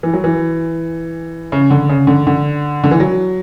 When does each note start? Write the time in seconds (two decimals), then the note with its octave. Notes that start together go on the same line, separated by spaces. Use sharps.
0.03 E3
0.13 F#3
0.24 E3
1.52 C#3
1.70 D3
1.89 C#3
2.07 D3
2.27 D3
2.84 D3
2.91 E3
3.00 F#3